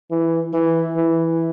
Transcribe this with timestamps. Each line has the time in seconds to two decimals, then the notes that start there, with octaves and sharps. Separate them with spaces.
0.11 E3
0.53 E3
0.97 E3